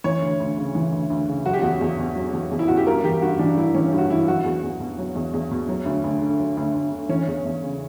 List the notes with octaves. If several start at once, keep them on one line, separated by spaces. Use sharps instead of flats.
E3 C#5
D2
D2
C#3
E3
D2
D2
C#3
F#3 F#4
G4
E2 F#4
E2
B2
F#3
E2
E2
E4
B2 F#4
G4
G2 A#4
E3 G4
G2 F#4
E3 D4
G2 E4
E3 C#4
G2
F#4
E3 E4
F#3 F#4
E2
E2
B2
F#3
E2
E2
B2
F#3
D2
D2
D3
F#3
D2
D2
D3
E3 C#4
E2
E2
C#3